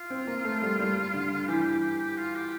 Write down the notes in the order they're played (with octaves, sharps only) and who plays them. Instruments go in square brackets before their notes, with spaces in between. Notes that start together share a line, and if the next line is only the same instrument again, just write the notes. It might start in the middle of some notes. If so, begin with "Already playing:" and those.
Already playing: [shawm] F4
[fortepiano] C4
A#3
A3
G3
G3
D3
[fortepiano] E3 [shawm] G4
[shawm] F4
G4